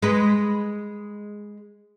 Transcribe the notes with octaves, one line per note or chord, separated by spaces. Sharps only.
G#3 B4